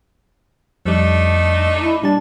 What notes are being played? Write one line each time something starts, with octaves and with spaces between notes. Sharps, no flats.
F2 G3 A3 D4 D#4
E4
A#2 G3 D4 A5